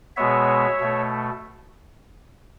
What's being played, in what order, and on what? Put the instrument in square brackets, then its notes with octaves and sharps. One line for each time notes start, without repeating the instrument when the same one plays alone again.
[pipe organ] B2 G#3 B3 C#5 E5
B2 A3